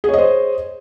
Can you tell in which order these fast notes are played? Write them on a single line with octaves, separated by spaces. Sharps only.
G#4 C#5 D#5 C5